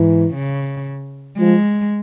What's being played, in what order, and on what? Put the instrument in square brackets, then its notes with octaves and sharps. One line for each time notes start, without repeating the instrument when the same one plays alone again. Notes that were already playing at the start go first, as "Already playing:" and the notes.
Already playing: [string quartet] G#2 [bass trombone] E3
[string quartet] C#3
[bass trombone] F3 [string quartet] G#3